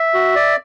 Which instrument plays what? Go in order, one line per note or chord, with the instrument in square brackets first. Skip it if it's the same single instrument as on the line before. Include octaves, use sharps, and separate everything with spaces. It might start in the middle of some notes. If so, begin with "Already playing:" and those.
Already playing: [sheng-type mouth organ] E5
[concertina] F#4
D5